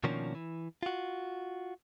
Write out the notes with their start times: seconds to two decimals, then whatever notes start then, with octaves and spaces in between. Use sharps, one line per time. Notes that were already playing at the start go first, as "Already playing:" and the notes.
0.04 B2 D#3 F3 A#3 C#4 D4
0.35 E3
0.83 F4 F#4